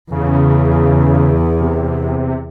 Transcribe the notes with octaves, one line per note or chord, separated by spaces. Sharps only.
E2 C#3
C3